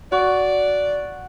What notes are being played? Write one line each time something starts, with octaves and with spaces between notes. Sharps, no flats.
F#4 D5